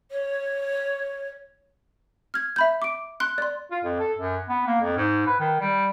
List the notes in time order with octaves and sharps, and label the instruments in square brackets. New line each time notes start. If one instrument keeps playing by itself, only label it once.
[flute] C#5
[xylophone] F6 G#6
E5 B5 G6
D6 D7
C6 F#6
D5 C6
[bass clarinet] F4
F2
A4
F#2
B3
A#3
F2
G#2
B4
D#3
G3